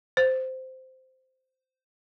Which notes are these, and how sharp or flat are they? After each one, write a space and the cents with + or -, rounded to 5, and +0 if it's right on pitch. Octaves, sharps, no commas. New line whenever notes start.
C5 -10